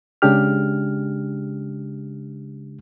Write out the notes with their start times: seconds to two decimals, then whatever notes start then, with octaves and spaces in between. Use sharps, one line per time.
0.22 C#3 G#3 D4 G4 F6